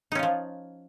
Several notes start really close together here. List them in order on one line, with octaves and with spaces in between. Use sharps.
D#4 C#4 F4 F3